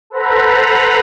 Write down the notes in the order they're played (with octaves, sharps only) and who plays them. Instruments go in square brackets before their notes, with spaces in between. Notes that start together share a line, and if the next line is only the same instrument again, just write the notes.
[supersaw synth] A4 B4 C5 F#5 A#5 B5